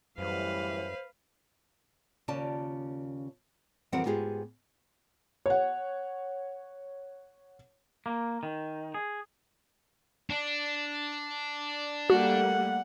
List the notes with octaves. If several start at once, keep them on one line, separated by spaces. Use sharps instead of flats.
F#2 A2 E3 G3 B4 C5 F5
D#2 C#3 C#4 F4 D5 A5
F2 E3 G3 C4 A#4 F#5
G#2 B3 F4 G4 G#4
C#5 F#5
A#3
D#3
G#4
D4
G3 A3 A#3 F#4 F#5